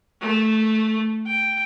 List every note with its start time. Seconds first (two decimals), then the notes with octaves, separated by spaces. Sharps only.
0.21 A3
1.27 G5